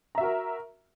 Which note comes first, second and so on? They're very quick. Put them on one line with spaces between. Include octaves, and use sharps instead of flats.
A#5 E5 F#4 A#4